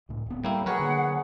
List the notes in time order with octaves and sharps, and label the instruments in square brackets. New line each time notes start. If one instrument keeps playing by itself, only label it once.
[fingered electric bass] C#2 A2
D1 B3
[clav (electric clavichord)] A2 A#3 E4 [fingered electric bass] G3 [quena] G5
[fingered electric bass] F#3 [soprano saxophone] G#4 [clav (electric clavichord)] A#4 B4 C#5 [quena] F#5
[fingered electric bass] D3 A#3